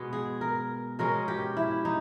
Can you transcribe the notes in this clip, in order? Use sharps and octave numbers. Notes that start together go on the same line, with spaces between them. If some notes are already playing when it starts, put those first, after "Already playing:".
Already playing: B2 G#3 B3
G#4
A#4
B2 G#3 C#4 A#4
G4
E4
D#4